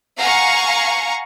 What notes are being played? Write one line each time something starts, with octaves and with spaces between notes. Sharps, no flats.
F5 F#5 G#5 A#5 C#6